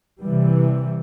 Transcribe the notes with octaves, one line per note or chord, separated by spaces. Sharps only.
C3 E3 G3